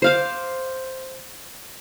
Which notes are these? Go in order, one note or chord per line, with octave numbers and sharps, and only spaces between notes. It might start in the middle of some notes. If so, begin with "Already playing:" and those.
C5 F5 D6